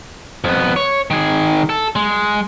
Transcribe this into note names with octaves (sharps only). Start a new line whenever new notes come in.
F2 B3
C#5
D#3 G#4
A4
G#3